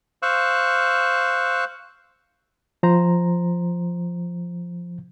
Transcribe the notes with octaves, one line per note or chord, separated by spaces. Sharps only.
C5 F5 C#6 E6 F#6
F3 C5 A#5